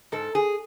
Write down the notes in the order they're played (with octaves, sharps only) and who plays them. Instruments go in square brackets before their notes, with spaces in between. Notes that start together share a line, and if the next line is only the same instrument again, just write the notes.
[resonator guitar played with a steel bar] G#2 A4
G#4